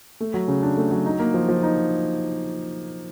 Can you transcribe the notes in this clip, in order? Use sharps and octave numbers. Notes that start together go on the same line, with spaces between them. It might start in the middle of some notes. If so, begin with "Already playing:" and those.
A3
F#3
C#3
D4
A3
F#3
D#4
A#3
F3
F3
D#4